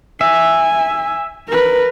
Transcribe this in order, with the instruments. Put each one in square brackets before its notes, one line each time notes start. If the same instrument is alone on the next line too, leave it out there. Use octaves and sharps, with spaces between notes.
[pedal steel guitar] E5 [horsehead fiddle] G#5
[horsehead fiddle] A#4 B4